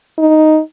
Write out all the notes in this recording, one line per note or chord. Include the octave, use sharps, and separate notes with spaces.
D#4